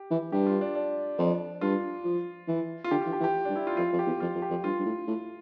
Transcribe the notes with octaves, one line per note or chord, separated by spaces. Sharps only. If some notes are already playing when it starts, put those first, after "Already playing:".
Already playing: G4
E3
G2 G4
F4
D4
D4
F2
G2 F4
F3
E3
F4
D3 G4
E3 F4
G4
E3
G4
G2 D4
E4
F4
F2 F4
F2
G4
E2
F2 F4
F2
G4
F2
G2 F4
G2
A2
A2